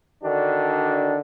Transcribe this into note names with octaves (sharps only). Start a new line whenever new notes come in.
D3 D#3 D4 F#4